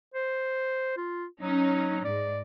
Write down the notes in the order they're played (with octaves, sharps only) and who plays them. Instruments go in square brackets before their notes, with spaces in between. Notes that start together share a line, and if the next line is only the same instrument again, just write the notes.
[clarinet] C5
F4
[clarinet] F#3 [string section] C#4 D#4
[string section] G#2 [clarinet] D5